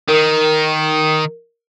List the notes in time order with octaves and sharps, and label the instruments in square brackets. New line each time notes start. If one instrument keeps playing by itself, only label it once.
[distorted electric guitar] D#3 [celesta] A#4